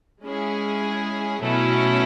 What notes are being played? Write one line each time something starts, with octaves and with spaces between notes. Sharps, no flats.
G#3 C#4 E4 G#4
B2 F#3 A3 C#4 E4